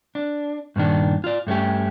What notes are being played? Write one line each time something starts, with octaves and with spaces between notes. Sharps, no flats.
D4
G2 A#2 D#3 D4
F4 D5
G2 A3 C#4 G4